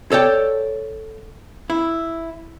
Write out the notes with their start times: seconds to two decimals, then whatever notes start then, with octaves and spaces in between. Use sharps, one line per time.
0.12 A4 C#5 D5 G5
1.70 E4